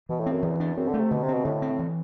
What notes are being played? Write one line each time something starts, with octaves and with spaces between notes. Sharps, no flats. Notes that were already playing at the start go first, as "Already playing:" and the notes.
B2 E3
A2
C4
F#2
E2 E3
D4
F#2 C4
D3
A3
C3
B2 D3
C3
B2 C4
A2 D3
C4
E3